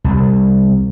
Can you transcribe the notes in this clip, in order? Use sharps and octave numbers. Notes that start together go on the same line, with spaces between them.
C2